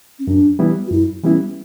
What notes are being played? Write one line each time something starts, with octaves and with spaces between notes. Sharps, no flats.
C#4
F#2 D4
E3 G3 B3 E4
F#4
F#2 E4
E3 G3 B3 C#4 E4